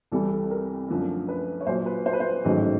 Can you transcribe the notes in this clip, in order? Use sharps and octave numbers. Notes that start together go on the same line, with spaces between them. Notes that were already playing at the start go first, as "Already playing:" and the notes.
C2 C3 E3 G3 A4
A4
A#4
F#2 D3 F3 A3
B4
C#5
A#1 A#2 F#3 C5
B4
C5
B4
C5
A1 G#2 D#3 F#3 A3